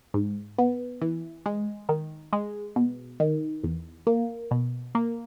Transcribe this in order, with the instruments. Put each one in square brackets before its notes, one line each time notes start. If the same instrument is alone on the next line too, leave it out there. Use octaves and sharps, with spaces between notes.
[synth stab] G#2
B3
E3
G#3
D#3
G#3
B2
D#3
E2
A#3
B2
A#3